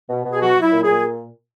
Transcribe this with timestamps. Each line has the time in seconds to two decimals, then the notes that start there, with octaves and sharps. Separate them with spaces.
0.10 B2
0.25 B2
0.31 G#4
0.41 F#3 F#4
0.57 F#3 E4
0.72 A#2
0.83 G#4
0.88 A#2